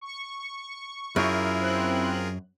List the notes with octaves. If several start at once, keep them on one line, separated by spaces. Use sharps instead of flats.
C#6
F#2 E4 F4 G#4 A#4
C4 F#6